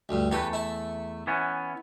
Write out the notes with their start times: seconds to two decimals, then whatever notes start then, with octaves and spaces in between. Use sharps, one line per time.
0.09 D2 G2
0.31 E2 A3 G4 B4
0.53 E4 A5
1.27 E3 B3 C#4